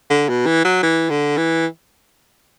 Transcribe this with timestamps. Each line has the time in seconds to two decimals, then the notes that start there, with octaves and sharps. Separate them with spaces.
0.10 D3
0.29 B2
0.46 E3
0.65 F#3
0.83 E3
1.10 D3
1.38 E3